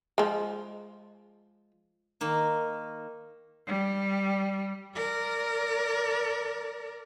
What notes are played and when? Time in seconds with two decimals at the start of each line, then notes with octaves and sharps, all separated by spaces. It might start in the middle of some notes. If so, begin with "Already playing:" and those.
0.18 F3 G#3
2.21 D#3 A#3
3.67 G3
4.96 A#4 D5